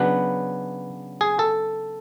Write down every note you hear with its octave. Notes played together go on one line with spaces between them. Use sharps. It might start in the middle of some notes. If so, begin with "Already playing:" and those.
Already playing: C#3 F#3 B3 D4 B4
G#4
A4